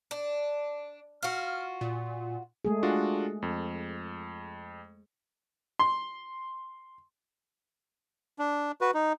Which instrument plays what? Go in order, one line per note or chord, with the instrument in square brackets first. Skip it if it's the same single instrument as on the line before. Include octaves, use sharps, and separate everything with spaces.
[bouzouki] D4
[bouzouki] F4 F#4 [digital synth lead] F6
[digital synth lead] A#2
[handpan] G#3 A3 G#4
[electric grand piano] D4 F4 F#4
F2
[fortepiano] C6
[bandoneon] D4
F#4 B4
D#4